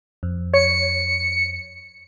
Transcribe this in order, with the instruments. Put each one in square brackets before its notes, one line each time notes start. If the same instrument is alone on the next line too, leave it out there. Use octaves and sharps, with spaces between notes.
[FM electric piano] F2
[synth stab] C#5 [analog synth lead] C#7